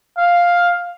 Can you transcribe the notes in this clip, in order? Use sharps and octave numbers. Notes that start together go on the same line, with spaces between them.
F5